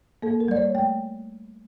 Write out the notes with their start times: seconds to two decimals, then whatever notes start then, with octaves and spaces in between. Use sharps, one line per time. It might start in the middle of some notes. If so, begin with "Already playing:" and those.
0.22 A#3 A4
0.40 A#4
0.48 G3 D5
0.57 C#5
0.75 A3 G5